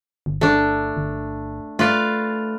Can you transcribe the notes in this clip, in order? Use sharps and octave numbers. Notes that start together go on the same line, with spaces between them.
G1
A3 D4
G1
A3 F4 B4 D5